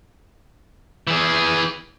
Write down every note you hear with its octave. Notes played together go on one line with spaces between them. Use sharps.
E3 G#4